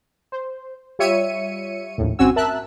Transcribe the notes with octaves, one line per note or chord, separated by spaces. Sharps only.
C5
G3 F4 C#5 E5 C#7 D#7
A#1 D#2 A2
G1 C4 C#4 F#4 G#5 E6
A#4 E5 A5 E6 F#6